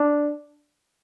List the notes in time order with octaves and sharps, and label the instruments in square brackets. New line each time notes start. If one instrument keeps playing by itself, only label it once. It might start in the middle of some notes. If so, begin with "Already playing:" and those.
Already playing: [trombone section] D4